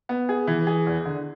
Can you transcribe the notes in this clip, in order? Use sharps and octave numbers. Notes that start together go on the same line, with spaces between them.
B3
G#4
E3
G#4
E2
D3